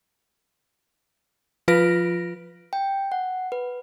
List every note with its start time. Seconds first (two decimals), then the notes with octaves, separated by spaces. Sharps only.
1.68 F3 F4 B4 A#6 D7
2.73 G5
3.12 F#5
3.52 B4